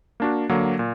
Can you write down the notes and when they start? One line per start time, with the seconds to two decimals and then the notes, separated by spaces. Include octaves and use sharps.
0.20 A#3 D4 F#4
0.49 D3 F#3 A#3
0.79 A#2